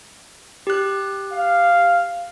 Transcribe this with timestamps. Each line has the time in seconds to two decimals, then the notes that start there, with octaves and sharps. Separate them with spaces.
0.67 G4 F#6
1.32 F5